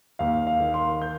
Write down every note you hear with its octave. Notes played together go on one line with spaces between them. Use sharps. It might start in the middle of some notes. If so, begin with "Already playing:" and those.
D#2 F5
F5
D#3 A#3
C6
G6